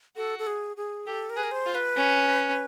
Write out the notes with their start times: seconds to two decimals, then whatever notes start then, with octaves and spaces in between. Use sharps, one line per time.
0.16 F#4 A4
0.39 A4
0.47 G#4
0.77 G#4
1.07 G4 A4
1.30 A#4
1.36 G#4 B4
1.43 A#4
1.51 C5
1.66 F4
1.75 B4
1.97 C#4